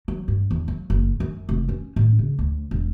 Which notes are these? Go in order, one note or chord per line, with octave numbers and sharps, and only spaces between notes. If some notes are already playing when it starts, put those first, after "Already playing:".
F#3
G2
E2
F#3
F#1
F#2
F1
C#4
A2
C#3
D2
E1